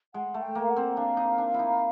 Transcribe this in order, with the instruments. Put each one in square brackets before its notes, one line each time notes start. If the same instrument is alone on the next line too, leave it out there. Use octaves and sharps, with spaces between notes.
[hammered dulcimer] G#3 [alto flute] F#5
[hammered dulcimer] A3
[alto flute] G5
[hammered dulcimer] A#3
[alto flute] F5
F#5
[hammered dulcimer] C4
[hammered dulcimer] D4 [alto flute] F5
[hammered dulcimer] D#4
D4
E4
D#4